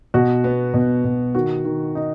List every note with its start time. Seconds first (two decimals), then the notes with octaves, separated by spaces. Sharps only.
0.14 B2 F#4
0.44 B3
0.74 B2
1.04 B2
1.34 D#3 F#4
1.65 D#3
1.95 D#4